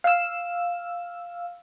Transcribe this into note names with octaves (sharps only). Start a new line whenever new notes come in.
F5 E6